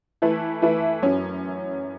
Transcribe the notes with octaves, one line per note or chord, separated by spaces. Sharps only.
E3 A3 E4 B4
E3 A3 E4 B4
F#2 F#3 C#4